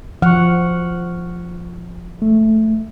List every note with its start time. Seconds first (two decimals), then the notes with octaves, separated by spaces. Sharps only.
0.22 F3 F#5 C#6 F6
2.22 A3